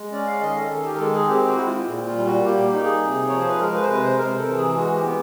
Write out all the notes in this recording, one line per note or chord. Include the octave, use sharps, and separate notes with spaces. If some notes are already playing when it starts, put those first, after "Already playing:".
Already playing: G#3
C#4 D5
F5
D#3 D#5
A4
D#3 A4
G4
A#4
G#3 A4
G#4
C4 G4
F#4
E4
F4
A#2
F4
G3
F#4
A#3 G4
G4
D#4
G#4
C3
F3 C#5
C5
B4
G#3 A#4
B4
C5
C3 B4
C5
C3 A#4
A4
E3
G#4
G#3 F#4
G4
B3